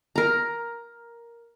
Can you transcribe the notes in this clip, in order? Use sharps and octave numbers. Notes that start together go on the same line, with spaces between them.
A#4 A#5